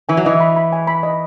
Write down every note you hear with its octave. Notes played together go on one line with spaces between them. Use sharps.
E3 G#5
F#3
E3 D#5
B5
B5
G#5
B5
D#5